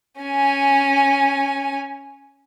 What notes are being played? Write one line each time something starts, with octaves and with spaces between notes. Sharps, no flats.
C#4 G#5